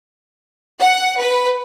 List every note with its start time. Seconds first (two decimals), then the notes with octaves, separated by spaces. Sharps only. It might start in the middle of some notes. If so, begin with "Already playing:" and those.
0.80 F#5
1.20 B4